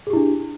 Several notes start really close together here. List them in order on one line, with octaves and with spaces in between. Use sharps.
G#4 G4 E4 D4